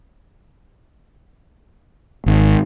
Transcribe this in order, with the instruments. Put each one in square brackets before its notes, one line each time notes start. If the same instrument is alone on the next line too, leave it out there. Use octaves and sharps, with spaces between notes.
[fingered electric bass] G#1